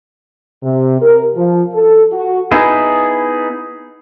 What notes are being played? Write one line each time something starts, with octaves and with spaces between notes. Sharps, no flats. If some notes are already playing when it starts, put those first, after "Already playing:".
C3
A#4
F3
A4
F#4
B3 D#4 E4 G#4